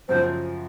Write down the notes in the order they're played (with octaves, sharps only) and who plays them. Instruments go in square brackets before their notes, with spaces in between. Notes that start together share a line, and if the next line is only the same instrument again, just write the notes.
[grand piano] F#2 C#3 F3 [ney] C5